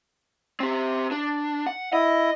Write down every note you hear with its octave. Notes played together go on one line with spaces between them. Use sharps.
C4 G4
D4
F#5
E4 D#5